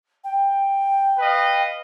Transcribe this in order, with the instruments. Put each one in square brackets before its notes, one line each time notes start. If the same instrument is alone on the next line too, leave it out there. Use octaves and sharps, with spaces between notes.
[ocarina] G5
[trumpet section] B4 D#5 F5